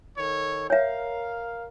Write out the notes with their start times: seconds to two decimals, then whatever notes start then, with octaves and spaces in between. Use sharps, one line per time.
0.17 D#3 A4 C#5
0.70 A#4 C#5 E5 F5